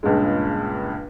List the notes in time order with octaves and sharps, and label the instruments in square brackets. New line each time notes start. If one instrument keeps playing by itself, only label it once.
[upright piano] C#2 G2 A#2 C#3 G#3